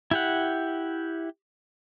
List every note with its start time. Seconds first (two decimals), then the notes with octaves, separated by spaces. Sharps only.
0.11 E4 G4 F#5